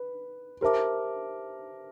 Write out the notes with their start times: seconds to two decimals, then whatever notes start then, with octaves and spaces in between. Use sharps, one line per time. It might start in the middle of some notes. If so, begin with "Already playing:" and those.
Already playing: B4
0.61 G4 A#4 C5 E5 A5 D6